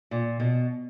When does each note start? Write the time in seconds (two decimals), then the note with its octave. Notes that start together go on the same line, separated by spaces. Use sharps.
0.11 A#2
0.40 B2